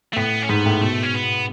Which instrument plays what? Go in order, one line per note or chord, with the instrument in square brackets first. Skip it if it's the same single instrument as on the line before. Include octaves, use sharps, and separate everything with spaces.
[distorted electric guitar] A3
[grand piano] A2 [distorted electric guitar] B3
[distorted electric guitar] C#4
[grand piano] G#2 [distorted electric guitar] B3
[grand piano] A2
[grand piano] B2 [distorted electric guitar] A3
[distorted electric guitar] C#4
B3